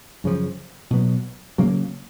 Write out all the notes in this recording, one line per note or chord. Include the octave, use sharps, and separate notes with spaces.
F#2 C#3 F3
B2 F#3 B3
C#3 F#3 A#3